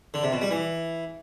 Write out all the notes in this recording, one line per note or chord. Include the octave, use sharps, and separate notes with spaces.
D3
C3
B2
G3
E3